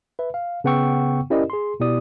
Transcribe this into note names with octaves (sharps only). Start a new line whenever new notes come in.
B4 E5
F5
C#3 B3 F#5 G5 C#6 E6
C#4 E4 G4 A#4 D5 D#5
G#4 C6
B2 B3 E4 G4 D5 D#6